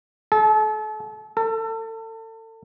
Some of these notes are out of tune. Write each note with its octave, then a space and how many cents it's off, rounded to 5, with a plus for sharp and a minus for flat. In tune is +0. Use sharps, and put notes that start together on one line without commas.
A4 -40
A4 +30